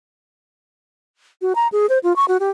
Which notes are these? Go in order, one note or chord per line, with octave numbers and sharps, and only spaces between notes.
F#4
A#5
G#4
C5
F4
C#6
F#4
G4